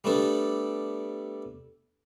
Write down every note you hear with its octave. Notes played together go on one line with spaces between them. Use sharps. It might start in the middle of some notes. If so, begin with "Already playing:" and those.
G3 A3 B3 D4 A4